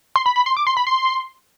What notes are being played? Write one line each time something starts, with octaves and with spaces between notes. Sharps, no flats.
C6
B5
B5
C6
D6
C6
B5
C6